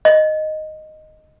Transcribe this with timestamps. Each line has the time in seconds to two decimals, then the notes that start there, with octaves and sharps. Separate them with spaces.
0.05 D#5